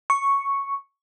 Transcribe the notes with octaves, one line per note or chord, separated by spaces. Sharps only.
C#6